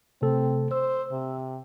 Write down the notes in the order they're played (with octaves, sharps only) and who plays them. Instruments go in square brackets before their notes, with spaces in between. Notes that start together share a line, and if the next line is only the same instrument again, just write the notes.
[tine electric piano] C3 A3 A4 [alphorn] C4
[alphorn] C5 [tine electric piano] E6
[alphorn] C3